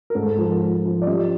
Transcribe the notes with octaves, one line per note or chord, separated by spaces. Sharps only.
A#4
G#2 A4
F3
F3
F3
D5
G3 D#5